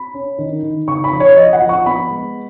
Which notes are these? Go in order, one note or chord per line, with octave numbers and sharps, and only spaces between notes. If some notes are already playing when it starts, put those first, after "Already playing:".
Already playing: B5
C#4
D#3
D#3
C#3 C#6
B5
F3
C#5
F3 D#5
F#5
F3
C#6
B3 B5
G#3